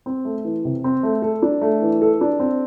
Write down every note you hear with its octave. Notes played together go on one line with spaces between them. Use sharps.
C4
A3
E3
C3
C4
A3
A4
D4
A3
E3
A4
D4
C4